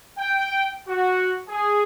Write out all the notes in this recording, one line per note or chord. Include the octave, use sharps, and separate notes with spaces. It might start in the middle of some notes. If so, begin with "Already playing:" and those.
G5
F#4
G#4